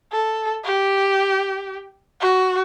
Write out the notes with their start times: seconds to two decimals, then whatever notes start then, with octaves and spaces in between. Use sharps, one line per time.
0.12 A4
0.65 G4
2.21 F#4